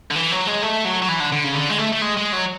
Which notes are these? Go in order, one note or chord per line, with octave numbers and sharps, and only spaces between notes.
D3
E3
F#3
G#3
A3
F#3
F#3
E3
D3
D3
C#3
D3
G#3
A3
A3
G#3
G#3
F#3